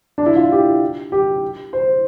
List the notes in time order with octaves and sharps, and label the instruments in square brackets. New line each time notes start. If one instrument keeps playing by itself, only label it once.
[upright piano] D4
E4
F4
G4
G4
C5